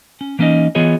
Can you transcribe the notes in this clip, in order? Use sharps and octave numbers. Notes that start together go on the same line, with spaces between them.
C#4
E3 A#3 C#4 D#4 D#5
E3 B3 F4 G#4 C#5 D#5